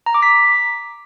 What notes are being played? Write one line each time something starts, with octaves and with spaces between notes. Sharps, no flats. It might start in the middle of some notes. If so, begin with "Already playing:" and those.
A#5
D6
B6